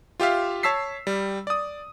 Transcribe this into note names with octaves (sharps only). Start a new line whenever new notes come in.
F4 G4 E5 F5
C#5 A5 E6 B6 C7
G3
D5 D#6